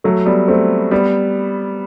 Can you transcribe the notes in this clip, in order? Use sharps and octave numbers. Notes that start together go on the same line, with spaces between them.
F#3 A3
G3 B3
A3 C4
G3 B3